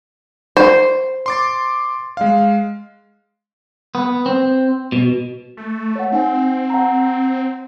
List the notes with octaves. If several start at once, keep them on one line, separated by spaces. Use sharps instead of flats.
C5
C6 D6 A6
G#3 F5
B3
C4
B2
A3
C#5 F#5
C4 D#4 F#5 G#5
F#5 A5 A#5